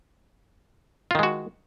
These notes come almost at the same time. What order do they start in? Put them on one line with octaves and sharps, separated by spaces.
F4 D#3 G#3 F#4